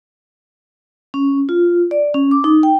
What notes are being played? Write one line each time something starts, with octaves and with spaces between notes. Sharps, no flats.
C#4
F4
D5
C#4
D6
D#4
G5